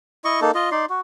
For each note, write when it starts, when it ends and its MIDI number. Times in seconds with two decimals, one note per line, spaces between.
0.25 0.40 64
0.25 0.40 75
0.25 0.40 85
0.41 0.51 58
0.41 0.51 63
0.41 0.51 69
0.54 0.70 65
0.54 0.70 75
0.71 0.86 63
0.71 0.86 74
0.71 0.86 84
0.90 1.01 66